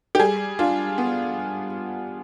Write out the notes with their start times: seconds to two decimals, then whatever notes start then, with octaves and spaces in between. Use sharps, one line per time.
0.15 G4
0.19 G3 G#4
0.59 D4 F4
0.98 B3